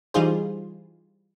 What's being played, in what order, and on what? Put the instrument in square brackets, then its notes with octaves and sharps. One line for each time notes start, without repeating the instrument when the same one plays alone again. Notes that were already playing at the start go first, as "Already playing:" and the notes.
[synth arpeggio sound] E3 G3 D#4 F4 G#4 C5